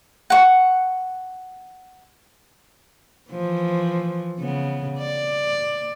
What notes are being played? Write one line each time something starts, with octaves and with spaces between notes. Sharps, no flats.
F#5 C#6
E3 F3
C#3 B3
D5